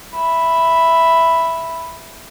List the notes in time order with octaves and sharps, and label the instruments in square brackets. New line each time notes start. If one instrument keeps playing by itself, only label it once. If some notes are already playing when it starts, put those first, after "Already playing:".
[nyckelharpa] E5 B5